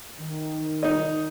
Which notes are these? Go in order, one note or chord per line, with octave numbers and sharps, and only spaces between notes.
D#3
D#4 D#5